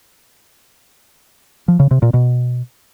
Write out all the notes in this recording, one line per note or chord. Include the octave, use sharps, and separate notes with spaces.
F3
C#3
C3
A#2
B2